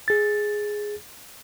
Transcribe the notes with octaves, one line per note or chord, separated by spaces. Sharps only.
G#4 A6